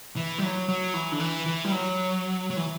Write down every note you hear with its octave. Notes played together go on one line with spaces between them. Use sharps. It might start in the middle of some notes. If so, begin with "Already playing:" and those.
E3
G3
F#3
F#3
E3
D3
E3
E3
G3
F#3
F#3
E3